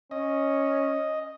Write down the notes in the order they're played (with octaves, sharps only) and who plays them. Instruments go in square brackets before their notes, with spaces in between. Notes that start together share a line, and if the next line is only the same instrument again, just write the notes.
[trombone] C#4 [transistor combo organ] D#5